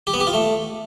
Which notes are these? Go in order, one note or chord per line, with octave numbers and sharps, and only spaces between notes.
G4
B3
G4
F4
A3